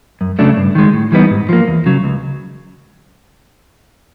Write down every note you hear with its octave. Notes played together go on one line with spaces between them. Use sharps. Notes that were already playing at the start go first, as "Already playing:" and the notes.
F#2
C#3 F#3 A3 D4
G2
D#3 G#3
A2
E3 G3 B3 D#4
G#2
F3 A#3
E2
C#3 F#3
C#2